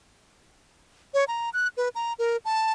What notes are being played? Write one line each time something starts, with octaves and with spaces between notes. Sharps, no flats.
C#5
A#5
F#6
B4
A#5
A#4
A5